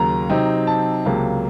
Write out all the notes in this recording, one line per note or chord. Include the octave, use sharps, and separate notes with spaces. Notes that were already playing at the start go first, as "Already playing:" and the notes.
Already playing: D#2 C#3 F#3 A#3 A#5
C3 F#3 C4 D#4
A5
C#2 C3 F#3 A#3